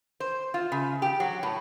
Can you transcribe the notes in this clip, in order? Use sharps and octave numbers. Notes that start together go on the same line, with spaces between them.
C5
F4
C#3
G4
F#3
A2